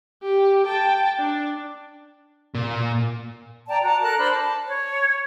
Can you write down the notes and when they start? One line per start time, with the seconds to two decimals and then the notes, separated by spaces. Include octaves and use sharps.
0.23 G4
0.67 G5 A5
1.19 D4
2.55 A#2
3.68 D5 G5 A5 A#5
3.82 F#4 A5 A#5
4.02 A4 A#4 A5 F#6
4.18 D4 C5 B5
4.31 A5
4.67 C#5